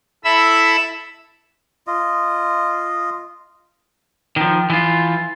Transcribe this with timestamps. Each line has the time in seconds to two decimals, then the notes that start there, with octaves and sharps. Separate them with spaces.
0.24 E4 A4 E5 B5 E6
1.87 F4 D#5
4.36 D#3 F3
4.70 E3 F4